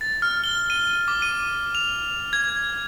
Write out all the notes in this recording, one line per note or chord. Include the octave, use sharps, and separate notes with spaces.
A6
F6
G7
D#7
D6
D#7
F7
G#6